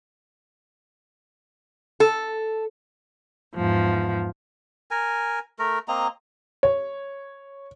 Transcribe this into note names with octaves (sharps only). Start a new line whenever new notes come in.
A4
E2 G#2 F3
A#4 G#5
A3 A#4
A#3 C4 D#5 A#5
C#5